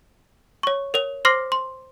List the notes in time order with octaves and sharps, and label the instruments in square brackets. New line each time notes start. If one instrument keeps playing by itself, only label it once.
[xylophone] C#5 C#6
A#4 C#5 F7
C5 C6 D6 F6 A#6 C7
C6